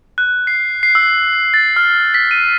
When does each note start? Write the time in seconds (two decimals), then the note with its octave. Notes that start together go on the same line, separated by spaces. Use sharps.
0.18 F#6
0.47 C7
0.83 C7
0.95 E6
1.54 A6
1.76 F6
2.14 B6
2.31 D#7